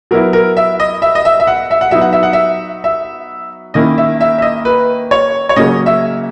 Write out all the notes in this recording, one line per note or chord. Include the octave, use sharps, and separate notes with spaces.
F#3 B3 E4 A#4
A#4
E5
D#5
E5
D#5
E5
E5
F#5
E5
F#5
F#3 B3 D#4 E5
F#5
E5
F#5
E5
E5
D#3 A#3 C#4 E4 D#5
E5
E5
E5
D#5
B4
C#5
C#5
C#3 F#3 A#3 C#4 D#5
E5